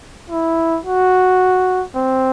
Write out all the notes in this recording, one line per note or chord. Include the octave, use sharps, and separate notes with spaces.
E4
F#4
C4